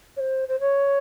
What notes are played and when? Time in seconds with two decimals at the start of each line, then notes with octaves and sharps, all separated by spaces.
0.16 C#5
0.20 C5
0.48 C5
0.60 C#5